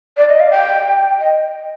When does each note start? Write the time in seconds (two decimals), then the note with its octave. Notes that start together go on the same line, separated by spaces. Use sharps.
0.17 D5
0.29 D#5
0.40 F5
0.51 G5
1.19 D#5